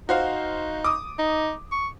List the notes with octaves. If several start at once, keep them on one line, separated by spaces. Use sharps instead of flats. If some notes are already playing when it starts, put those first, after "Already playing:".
D#4 F#4 C5 F5
D6 D#6
D#4
C#6